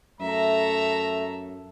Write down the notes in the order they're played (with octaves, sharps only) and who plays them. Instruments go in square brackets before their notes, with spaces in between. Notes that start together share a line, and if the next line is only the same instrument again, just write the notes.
[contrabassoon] F#2 [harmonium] A3 [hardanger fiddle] A4 E5 [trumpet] A#5